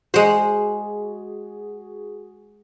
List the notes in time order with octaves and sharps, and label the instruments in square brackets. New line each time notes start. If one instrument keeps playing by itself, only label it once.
[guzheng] G#3 C5 [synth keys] F#4 G#4